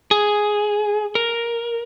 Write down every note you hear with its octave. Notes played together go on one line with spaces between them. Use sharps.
G#4
A#4